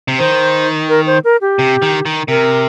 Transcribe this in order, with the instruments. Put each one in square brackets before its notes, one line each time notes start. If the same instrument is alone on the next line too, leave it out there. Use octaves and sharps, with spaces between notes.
[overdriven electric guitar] C3
[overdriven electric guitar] D#3 [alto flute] C5
[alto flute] A#4
C5
A#4
G4
[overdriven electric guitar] C3
D#3
D#3
[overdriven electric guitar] C3 [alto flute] A#4